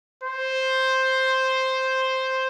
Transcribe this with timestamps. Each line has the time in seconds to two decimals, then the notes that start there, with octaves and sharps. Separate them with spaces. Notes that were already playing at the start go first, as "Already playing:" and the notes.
0.23 C5